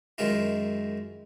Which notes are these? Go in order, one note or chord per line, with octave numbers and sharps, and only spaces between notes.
F#2 D#3 G#3 E4 F4